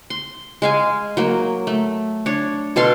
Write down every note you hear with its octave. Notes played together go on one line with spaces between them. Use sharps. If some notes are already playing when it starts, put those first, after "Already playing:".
C6
G#3 F5 G#5
F#3 A#3
A3
D4 C#5
B2 A4 F5 C6